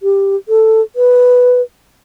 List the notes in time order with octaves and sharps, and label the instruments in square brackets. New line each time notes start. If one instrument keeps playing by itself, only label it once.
[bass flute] G4
A4
B4